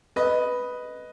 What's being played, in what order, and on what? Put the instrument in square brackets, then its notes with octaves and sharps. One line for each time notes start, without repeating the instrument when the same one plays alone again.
[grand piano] B4 D#5